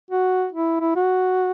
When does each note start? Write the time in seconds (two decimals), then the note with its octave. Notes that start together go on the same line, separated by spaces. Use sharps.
0.11 F#4
0.52 E4
0.81 E4
0.96 F#4